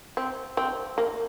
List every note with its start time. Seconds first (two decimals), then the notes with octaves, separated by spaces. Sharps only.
0.17 C4
0.57 C4
0.98 A#3